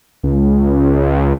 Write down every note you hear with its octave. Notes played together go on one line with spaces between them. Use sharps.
C#2